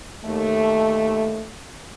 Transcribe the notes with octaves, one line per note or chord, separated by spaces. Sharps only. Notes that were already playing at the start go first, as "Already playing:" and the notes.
D#2 A3